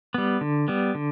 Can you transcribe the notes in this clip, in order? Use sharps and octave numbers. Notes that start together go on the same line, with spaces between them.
G3 B3
D3
G3 B3
D3